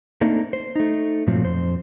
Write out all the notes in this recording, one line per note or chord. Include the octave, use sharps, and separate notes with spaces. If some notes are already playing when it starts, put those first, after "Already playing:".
A3 A#3 C4 D4 D#4
C5
A3 D#4
G2 A#2 F3 F#3 A3 C4
F2 C5